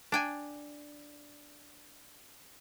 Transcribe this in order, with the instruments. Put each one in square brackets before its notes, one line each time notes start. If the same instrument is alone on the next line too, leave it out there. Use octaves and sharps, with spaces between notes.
[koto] D4 G5 G#5